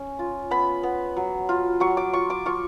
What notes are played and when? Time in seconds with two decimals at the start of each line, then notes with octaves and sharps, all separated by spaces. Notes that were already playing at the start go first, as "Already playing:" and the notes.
Already playing: C#4
0.19 F4
0.51 B3 B5
0.83 B3
1.17 F#3
1.49 F4
1.80 F#3 C#6
1.97 D6
2.13 F4 C#6
2.30 D6
2.46 F4 C#6